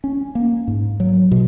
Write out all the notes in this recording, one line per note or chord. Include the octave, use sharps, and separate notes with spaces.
C#4
A#3
G#2
F#3
B2